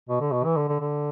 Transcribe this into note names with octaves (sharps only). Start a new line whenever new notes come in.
B2
D3
B2
E3
D3
D3
D3